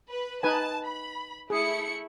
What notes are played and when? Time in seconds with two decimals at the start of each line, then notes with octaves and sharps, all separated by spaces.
0.10 B4
0.43 D#4 B4 G#5 A5
0.86 B5
1.50 A3 E4 G#4 C#7